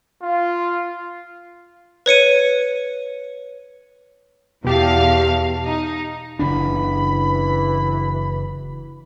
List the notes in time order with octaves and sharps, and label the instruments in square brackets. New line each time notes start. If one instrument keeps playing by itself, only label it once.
[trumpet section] F4
[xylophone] B4 C#5 C#7 D#7
[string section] E2 F5 [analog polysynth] B2 G4 A5
[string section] D#4
[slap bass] F#1 C#3 D4 [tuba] E3 [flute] B5